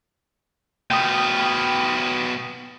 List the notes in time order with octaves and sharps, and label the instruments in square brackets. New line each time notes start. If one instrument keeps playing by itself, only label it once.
[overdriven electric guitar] B2 F4 [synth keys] G5 D#6